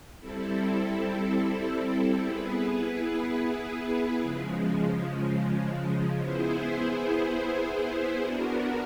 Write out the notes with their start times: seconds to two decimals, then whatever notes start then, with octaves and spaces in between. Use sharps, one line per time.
0.20 G3 C4 E4 A4
2.20 B3 E4 G#4 B4
4.20 C#3 F3 G#3
6.19 B3 E4 G#4 C5
8.19 B3 D4 F#4 A#4